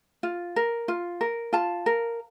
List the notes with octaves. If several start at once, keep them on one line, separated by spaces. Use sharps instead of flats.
F4
A#4
F4
A#4
F4 F5 A5
A#4